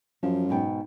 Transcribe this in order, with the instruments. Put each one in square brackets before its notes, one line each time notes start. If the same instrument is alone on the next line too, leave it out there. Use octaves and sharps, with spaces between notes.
[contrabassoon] F#2 [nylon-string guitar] F3
[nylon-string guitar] G#2 B2 G5